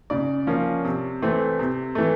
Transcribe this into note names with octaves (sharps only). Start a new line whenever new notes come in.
C#3 D5
F3 A#3 C#4
C3
E3 A3 C4
C3
E3 A3